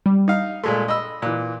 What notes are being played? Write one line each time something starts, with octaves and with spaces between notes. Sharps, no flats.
G3
D#4 F5
A#2 G#3 A3 C6
D#5 B5 E6
A#2 E3 F#6